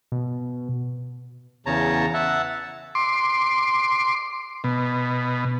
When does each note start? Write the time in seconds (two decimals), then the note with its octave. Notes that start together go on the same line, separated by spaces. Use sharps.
0.12 B2
1.66 E2 C#3 C#5 A5 A#5
2.14 E5 F#5 A5
2.95 C6 D6
4.64 B2